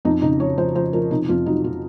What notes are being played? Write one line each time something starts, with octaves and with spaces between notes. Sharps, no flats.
F2 D#4
C#3 D#4
F3 C#5
F3 C5
F3 C5
F3 A#4
C3 D#4
F2 F4
F#3 D#4
C3 F4